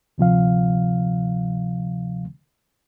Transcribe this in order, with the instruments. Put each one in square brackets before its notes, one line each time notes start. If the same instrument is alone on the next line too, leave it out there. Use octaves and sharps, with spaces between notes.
[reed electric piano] D2 C3 F3 F5